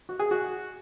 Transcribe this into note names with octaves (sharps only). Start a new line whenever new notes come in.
F#4
G#4
F#4